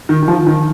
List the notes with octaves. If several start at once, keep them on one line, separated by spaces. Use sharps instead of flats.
D#3
D#3
F3
D#3